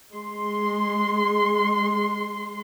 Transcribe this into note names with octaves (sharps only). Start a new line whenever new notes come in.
G#3 C6